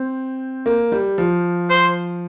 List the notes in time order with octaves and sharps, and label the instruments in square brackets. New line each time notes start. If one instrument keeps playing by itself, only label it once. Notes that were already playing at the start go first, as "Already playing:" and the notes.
Already playing: [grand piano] C4
A#3
G3
F3
[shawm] C5